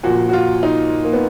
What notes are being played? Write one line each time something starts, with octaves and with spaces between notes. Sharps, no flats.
A#2 F3 F#4
F#4
F4
D#4
A#3
B3